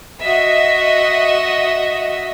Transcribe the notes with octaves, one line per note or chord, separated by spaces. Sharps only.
F#4 D#5 E5